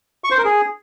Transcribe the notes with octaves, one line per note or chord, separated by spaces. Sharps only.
C#6
C5
A#4
G#4